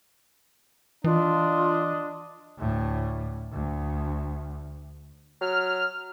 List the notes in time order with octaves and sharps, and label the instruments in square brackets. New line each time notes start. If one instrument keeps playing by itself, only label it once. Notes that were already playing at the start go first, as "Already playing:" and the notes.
[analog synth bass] E3 [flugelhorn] D4 [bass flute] F4 [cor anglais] D#5
[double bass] D2 A2
D2
[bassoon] F#3 [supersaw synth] F6